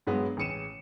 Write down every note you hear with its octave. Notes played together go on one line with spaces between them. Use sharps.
G2 F#3 G#3 B3
A1 C#3 C#4 C#7 D#7 E7